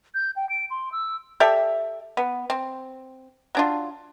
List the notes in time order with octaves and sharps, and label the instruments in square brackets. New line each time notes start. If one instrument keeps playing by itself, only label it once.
[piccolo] G6
G5
D7
C6
E6
[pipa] G4 A4 D5 E5
B3
C4
F#3 D4 F4